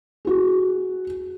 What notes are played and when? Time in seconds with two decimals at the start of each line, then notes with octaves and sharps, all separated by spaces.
0.25 F#4 G#4